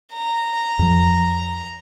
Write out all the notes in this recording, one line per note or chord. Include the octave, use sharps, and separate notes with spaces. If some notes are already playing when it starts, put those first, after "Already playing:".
A#5
F2 F3